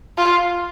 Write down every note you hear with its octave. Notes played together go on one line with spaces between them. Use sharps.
F4